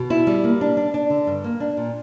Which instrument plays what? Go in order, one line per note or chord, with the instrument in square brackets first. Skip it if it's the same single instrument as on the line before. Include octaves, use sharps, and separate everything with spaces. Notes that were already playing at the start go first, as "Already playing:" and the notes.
Already playing: [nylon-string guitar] B2
E4
G3
A#3
D4
D4
D4
D3
G2
A#3
D4
A#2